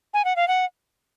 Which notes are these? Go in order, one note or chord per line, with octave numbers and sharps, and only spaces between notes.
G#5
F#5
F5
F#5